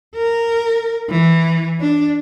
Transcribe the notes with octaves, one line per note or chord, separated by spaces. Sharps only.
A#4
E3
D4